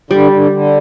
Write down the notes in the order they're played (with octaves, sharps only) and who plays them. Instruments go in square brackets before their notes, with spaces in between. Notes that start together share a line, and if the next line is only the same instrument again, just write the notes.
[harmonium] D3 [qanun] G3
[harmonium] D3
D3